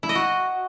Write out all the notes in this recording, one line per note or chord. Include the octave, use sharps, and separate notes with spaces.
E4
D#5
F#4